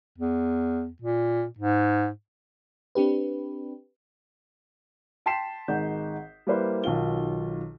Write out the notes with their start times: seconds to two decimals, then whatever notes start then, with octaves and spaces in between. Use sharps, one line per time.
0.18 E2
1.02 A#2
1.58 G#2
2.95 C4 D4 G4 B4
5.26 G5 A5 C6 B6 C7 E7
5.68 G#1 D#4 G#4 F#5 G6
6.47 G3 A#3 E4 B4 C5
6.84 B1 D#3 F#3 F4 G7